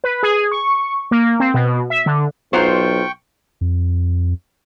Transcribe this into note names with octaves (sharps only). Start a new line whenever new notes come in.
B4
G#4
C#6
A#3
C4
B2
E5
D3
B1 F#3 F4 C5 G5 C#6
F2